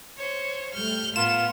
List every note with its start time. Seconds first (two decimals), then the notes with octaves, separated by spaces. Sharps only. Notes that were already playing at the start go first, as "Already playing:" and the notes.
0.17 C5 C#5
0.73 G3 A3 F6 G6
1.16 A2 B3 F4 A#4 E7